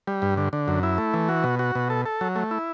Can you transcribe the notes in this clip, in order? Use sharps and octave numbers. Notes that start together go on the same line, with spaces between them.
G3
G2
D3
D3
F#2
E4
A3
E3
F#4
B2
F#4
B2
A4
A4
F#3
A3
E4